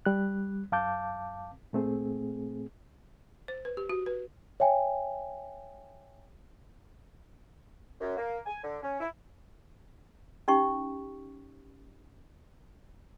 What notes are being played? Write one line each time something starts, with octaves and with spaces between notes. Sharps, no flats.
G3 F#6
F#2 F5 A5 D6 G6
A#2 A3 C4 G#4
C5
B4
G4
F#4
B4
C#5 E5 G5 G#5
F#2
A#3
G#5
D3
C#4
E4
C#4 D#4 G4 C#6